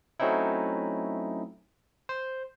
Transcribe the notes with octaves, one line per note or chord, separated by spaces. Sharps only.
F#3 A3 C4 C#4 D#4 E4
C5